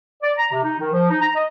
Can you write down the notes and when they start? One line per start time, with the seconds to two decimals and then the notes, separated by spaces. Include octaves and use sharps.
0.22 D5
0.38 A#5
0.52 C3
0.64 D#4
0.80 D#3
0.93 F3
1.11 D#4
1.22 A#5
1.36 D#5